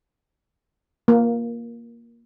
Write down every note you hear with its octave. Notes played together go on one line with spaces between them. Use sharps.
A#3